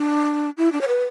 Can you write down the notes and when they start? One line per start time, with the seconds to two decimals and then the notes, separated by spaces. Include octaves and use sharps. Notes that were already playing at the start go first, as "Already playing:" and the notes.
Already playing: D4
0.57 E4
0.72 D4
0.81 C#5
0.87 B4